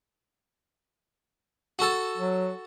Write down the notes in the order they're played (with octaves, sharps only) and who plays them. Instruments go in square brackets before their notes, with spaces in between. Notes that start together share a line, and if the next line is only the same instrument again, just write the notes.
[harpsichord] F#4 A4
[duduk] F#3